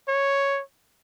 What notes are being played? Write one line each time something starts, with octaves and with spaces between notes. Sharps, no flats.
C#5